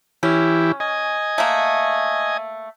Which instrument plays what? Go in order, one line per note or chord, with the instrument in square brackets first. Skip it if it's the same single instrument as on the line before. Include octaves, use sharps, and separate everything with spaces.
[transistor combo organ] E3 E4 G4 [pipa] C#4
[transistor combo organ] D#5 G#5
[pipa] A3 A#3